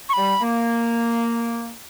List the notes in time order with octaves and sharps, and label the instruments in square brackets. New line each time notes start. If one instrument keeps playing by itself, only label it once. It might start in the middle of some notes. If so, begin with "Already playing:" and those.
[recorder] C#6
[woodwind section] G3 [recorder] B5
[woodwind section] A#3